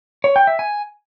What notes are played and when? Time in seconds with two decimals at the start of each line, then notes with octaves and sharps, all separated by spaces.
0.24 C#5
0.36 G5
0.47 E5
0.59 G#5